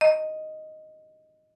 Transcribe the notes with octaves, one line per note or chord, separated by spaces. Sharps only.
D#5